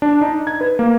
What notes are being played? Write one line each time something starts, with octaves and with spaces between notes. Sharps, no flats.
D4
D#4
G#6
B4
A#3